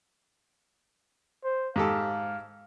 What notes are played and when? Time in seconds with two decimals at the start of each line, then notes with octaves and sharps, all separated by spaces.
1.44 C5
1.76 G#2 G4 A4 F5